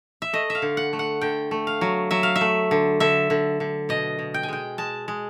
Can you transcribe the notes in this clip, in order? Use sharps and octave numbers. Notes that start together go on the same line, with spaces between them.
E5
A3 D#5
E5
F5
D3
F#5
A3
F#5
D3 G5
A3
F5
F#3
F#3 E5
F5
E5
A3
D3
D3 E5
D3
D3
B2 D#5
B2
G5
G#5
G#3 G5
G#3 A5
G#3